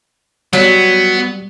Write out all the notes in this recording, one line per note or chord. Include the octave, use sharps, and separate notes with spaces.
F#3 G3 B3